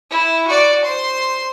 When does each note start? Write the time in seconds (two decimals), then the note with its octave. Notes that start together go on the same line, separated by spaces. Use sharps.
0.10 E4
0.47 F#4 D5
0.85 C5 C6